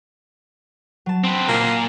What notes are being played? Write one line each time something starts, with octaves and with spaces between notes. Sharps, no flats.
F#3 A5
C4 B4
A#2 A#3